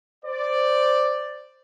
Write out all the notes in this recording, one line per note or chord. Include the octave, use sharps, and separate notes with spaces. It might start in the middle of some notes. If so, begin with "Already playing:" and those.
C5 D5